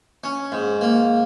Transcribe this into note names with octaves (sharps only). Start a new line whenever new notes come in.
C#4
G#2
A#3